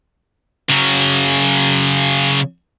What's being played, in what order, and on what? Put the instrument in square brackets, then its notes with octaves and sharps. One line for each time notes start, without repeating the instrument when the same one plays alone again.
[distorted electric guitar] C#3 F#3